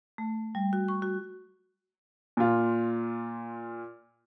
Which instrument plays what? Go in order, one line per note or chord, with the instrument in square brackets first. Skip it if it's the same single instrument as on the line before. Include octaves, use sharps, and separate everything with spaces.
[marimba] A3
G3
F#4
C#6
F#4
[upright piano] A#2 F4